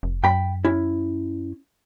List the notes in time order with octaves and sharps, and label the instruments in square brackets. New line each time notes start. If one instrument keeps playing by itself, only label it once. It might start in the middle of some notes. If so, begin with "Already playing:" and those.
[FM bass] F1
[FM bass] F#2 [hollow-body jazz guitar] G5 B5
[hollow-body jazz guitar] C#4 E4